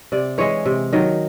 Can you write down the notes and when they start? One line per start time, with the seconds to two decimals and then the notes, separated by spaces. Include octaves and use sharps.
0.12 C3 D5
0.38 E3 G#3 C#5
0.66 C3
0.93 D#3 F#3